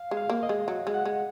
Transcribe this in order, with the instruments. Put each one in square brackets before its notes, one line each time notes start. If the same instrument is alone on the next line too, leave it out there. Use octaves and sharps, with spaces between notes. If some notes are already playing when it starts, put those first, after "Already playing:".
Already playing: [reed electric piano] F5
[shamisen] G#3
[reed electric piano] F5
[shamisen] A#3
[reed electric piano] D#5
[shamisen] G#3
F#3
G#3
[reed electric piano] F#5
[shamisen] G#3